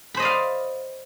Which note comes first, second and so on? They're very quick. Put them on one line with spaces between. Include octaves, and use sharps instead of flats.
B5 C5 D#5 D5 F5